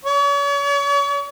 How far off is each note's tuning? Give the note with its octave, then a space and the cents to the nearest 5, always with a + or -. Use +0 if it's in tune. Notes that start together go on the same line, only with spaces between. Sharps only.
C#5 +40